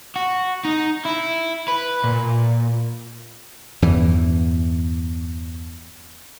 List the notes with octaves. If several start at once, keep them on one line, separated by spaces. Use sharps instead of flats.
F#4
D#4
E4
B4
A#2
E2 G2 E3